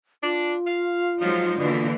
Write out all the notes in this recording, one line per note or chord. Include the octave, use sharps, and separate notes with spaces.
D4 F4
F5
F3 F#3 G#3 D#4
B2 D3 E3 A#3